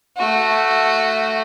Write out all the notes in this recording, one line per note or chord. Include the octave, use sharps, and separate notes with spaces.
A3 F#4